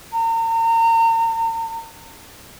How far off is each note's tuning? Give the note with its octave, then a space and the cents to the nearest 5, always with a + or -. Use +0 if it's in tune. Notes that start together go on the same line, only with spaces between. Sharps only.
A#5 -40